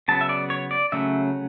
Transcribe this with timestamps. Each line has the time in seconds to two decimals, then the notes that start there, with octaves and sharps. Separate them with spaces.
0.08 C#3 F#3 B3 A5
0.21 E5
0.29 D5
0.50 C#5
0.71 D5
0.92 C#3 F#3 A3 C#4 E5